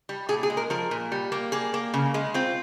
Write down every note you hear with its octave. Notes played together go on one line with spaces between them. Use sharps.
G3
A#2 G#4
G#4
G#3
A#4
F3 A#4
A#2
G3
A#3
A#3 G#4
A#3
C#3
G#3
C4 F4